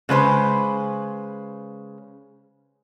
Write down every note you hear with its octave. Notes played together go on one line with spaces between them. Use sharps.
C#3 G#3 B4 C5